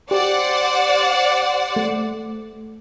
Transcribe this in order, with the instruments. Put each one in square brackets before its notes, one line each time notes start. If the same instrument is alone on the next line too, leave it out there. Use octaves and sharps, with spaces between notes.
[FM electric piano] G4 [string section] C5 D5 F#5
[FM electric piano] A3